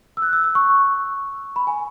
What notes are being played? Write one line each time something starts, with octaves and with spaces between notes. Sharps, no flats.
E6
F#6
E6
E6
C#6
B5
G#5